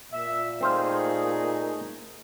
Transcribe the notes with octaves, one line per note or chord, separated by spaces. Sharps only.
A#2 E5
A3 C4 D#4 G#4 C5 F5